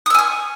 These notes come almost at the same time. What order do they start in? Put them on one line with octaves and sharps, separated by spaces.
D#6 E6 G#5 C#6